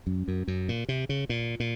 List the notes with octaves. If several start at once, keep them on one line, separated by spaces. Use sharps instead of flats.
F#2
F#2
F#2
A#2
C3
C#3
A#2
A#2